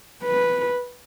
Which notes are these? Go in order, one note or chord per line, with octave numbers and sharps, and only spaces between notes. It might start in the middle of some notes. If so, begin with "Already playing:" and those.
B4